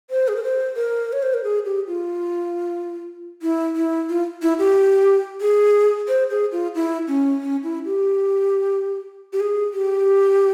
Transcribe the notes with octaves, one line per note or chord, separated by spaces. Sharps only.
C5
G#4
A#4
C5
A#4
C#5
C5
A#4
G#4
G4
F4
E4
E4
F4
E4
G4
G#4
C5
G#4
F4
E4
C#4
C#4
E4
G4
G4
G#4
G4